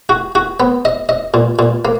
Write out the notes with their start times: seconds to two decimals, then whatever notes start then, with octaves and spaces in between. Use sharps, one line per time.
0.09 F#4
0.35 F#4
0.60 B3
0.85 D#5
1.09 D#5
1.34 A#2
1.59 A#2
1.85 A#3